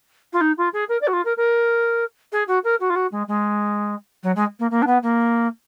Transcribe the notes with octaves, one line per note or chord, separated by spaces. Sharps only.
F4
D#4
F4
G#4
A#4
D5
F#4
F4
A#4
A#4
G#4
F#4
A#4
F#4
F4
F#4
G#3
G#3
F#3
G#3
A#3
A#3
D4
B3
A#3